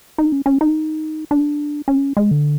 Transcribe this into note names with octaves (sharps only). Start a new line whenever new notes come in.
D#4
C#4
C#4
D#4
D4
C#4
G#3
D3